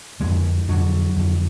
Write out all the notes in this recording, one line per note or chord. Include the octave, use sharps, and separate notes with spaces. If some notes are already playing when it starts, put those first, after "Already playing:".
F2 D3 G#3
F2 D3 F#3
F2 D3